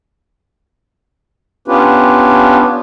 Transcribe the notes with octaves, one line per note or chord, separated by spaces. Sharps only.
B3 C#4 D4 F4 G4 B4